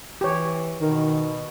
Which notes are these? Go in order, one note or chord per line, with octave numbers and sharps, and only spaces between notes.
E3 G4 C#5
B2 D#3